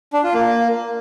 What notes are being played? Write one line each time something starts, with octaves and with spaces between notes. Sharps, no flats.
D4
F4
A#3